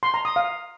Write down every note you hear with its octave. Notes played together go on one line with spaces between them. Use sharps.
C6
A#5
D#6
F5